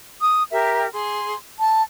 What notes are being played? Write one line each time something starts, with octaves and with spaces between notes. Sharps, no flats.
D#6
G4 A#4 E5
G#4 C6
A5